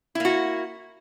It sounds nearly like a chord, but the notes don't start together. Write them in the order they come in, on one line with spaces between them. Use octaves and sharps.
E4 A#3 F#4